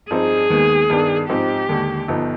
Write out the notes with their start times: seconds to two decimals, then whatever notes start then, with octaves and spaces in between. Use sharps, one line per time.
0.10 G2 F3 C4 D#4 G#4
0.50 D#2 D#3 G#3 B3
0.90 G2 D#3 B3 D4
1.29 G#2 F3 C4 D#4 G4
1.69 D#2 D3 G#3
2.08 G1 G2 F3 B3 D#4